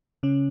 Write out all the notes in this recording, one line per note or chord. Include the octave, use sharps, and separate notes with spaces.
C#3 C#4